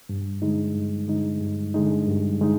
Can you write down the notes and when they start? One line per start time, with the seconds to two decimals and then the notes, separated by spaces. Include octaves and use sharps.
0.09 G2
0.42 D3 G#3 D#4
0.75 G2
1.08 D3 G#3 D#4
1.41 G2
1.74 D3 G#3 D#4
2.07 G2
2.41 D3 G#3 D#4